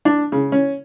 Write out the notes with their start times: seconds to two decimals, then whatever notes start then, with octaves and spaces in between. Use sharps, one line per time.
0.05 D4
0.32 C#3
0.52 C#4